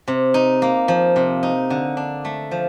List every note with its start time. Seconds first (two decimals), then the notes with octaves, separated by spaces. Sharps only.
0.08 C3
0.34 D#4
0.62 A#3
0.88 F3
1.16 C3
1.43 D#4
1.70 D3
1.97 D4
2.25 A3
2.51 F3